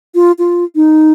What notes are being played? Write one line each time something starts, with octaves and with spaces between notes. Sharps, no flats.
F4
F4
D#4